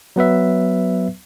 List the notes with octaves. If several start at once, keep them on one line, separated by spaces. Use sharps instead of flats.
F#3 B3 B4 E5